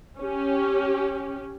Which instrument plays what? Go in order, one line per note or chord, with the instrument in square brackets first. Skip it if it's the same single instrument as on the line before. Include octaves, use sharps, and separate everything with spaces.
[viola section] C#4 G4